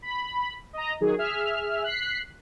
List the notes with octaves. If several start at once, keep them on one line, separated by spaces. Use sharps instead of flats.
B5
D#5 A#5
D#3 F#3 G#4
G#4 E5 F6
F#6 B6 C7